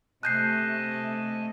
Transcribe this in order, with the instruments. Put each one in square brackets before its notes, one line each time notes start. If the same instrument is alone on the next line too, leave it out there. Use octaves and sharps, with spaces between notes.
[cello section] C3 A3 [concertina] D#5 G#5 A5 [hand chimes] F#6 G6 C7